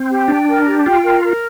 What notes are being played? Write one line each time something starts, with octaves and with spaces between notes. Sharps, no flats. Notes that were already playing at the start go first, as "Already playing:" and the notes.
Already playing: C4
G4
D4 G5
A#4
G4
F4 G5
A#4
A#4